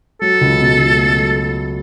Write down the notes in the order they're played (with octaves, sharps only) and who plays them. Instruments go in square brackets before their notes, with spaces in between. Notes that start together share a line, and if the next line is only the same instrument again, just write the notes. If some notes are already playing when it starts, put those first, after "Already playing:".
[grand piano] F#3 [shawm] A4
[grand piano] C#2
B2
C#2
A3
F#3